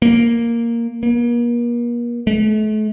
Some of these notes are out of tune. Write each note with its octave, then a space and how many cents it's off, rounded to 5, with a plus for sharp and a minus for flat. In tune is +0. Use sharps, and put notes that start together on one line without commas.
A#3 +0
A#3 +40
A3 -40